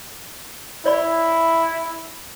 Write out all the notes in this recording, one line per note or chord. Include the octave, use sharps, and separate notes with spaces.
E4 C#5 D5 B5